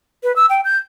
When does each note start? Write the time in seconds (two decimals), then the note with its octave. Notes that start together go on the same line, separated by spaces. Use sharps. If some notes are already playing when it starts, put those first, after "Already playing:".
0.23 B4
0.36 E6
0.50 G5
0.65 G6